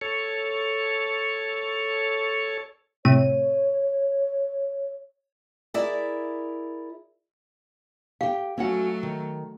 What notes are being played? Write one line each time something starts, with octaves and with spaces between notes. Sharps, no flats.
A4 C#5
A2 C3 C#5 D#7
E4 G#4 A#4 D5 E5
G4 F5 G5
F#3 A3 C#4 F#4 F#5
D#3